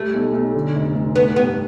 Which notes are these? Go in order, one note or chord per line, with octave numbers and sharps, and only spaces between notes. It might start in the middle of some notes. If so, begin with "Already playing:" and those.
Already playing: G3 A3
B1
B1
D3
F1
F1
A3 B3
G2 B3